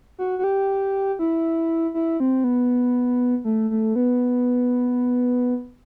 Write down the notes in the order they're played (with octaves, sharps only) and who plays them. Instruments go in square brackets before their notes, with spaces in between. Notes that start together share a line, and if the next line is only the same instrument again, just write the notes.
[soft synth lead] F#4
F#4
G4
E4
E4
C4
B3
A3
A3
B3